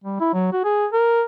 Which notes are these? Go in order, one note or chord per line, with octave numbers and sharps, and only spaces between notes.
G3
E4
F#3
F#4
G#4
A#4